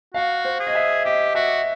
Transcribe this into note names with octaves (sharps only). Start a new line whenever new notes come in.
F#4 F5
C5
G#4
D#5
E5
G4 D#5
F#4 E5